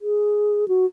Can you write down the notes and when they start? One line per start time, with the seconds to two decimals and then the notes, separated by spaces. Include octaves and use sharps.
0.01 G#4
0.68 F#4